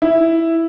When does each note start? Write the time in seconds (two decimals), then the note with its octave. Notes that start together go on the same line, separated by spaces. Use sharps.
0.02 E4